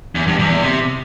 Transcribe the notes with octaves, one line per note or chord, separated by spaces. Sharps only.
E2
G2
E2
E2
C3